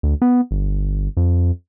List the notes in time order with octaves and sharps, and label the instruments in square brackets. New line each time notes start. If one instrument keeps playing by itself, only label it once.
[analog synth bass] D2
B3
G1
F2